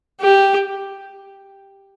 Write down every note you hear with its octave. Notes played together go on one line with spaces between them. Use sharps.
G4